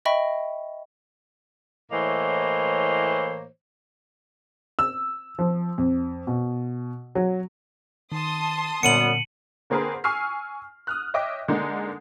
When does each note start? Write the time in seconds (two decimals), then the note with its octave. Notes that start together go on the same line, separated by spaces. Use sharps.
0.05 D#5 E5 G5 B5 C#6 A#6
1.92 A2 E3 A#3 C5 C#5 D#5
4.79 E6
5.39 F3
5.78 F2
6.27 B2
7.15 F#3
8.12 D#3 A5 C6 D#6
8.83 F#2 A#2 D3 G3 B3 C#7 D#7 F#7
9.70 D3 A#3 C4 G#4 A#4 B4
10.04 G#5 C#6 E6 F6 C7
10.87 D#6 F6 F#6
11.14 C#5 D#5 E5 G5 D6
11.48 D3 G#3 A#3 D4 D#4